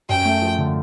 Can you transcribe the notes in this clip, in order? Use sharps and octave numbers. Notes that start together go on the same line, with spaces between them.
F#2 G5
A3
F3
D3